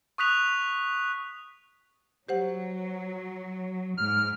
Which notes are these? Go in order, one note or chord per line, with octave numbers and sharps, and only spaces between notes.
C#6 D#6 F#6 B6 F7
F#3 G4 C5 F#5
G#2 F6